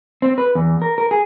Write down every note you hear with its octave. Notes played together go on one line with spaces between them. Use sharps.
C4
B4
E2
A#4
A#4
G#4